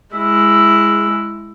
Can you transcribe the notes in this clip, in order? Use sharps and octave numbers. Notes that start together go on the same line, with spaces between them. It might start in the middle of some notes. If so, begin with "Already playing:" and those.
G#3 E4